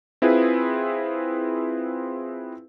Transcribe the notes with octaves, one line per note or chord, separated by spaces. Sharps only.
C4 E4 F4 G#4 B4